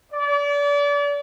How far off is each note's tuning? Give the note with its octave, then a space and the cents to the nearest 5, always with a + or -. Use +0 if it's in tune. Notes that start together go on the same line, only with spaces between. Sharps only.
D5 -35